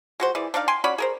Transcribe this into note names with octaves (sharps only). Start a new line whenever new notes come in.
G#3 F#4 C5
E3 G#4 D5
D4 D#4 D5 F5
G5 G#5 C6
C#4 F#4 D5 B5
G#4 A#4 C5